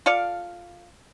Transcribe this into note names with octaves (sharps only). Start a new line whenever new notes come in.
F4 A4 D5 F5